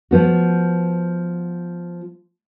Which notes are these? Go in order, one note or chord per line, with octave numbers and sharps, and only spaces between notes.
F3 B3 F#4